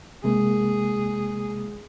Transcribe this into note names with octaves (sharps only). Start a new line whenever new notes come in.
C3 G#3 A#3 G#4